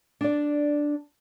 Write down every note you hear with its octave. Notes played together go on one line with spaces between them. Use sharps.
D4 D5